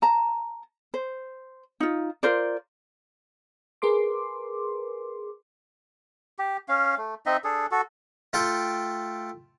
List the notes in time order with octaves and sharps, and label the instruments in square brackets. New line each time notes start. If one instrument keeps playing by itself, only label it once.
[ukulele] A5 A#5
C5
D#4 F4
F4 A#4 C5 D5
[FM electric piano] G#4 A#4 B4 C6 D6
[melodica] G4
C#4 F5
A3
C4 D#4 D#5 E5
D4 G#4 A4
F#4 A4
[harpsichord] A3 F4 A4 G5